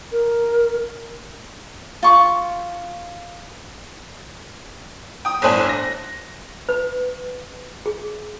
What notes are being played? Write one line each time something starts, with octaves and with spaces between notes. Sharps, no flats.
A#4
F4 C#6 D6
G5 D#6
G1 A2 D4 C5 G#5 F#6
A#6
B4
G#4